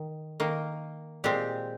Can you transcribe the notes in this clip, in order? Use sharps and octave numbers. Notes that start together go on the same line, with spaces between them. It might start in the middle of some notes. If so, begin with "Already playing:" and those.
Already playing: D#3
D#3 A#3
A#2 G#3 C4 G4